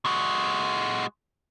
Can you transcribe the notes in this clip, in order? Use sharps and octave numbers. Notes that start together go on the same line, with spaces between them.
G#3 F#4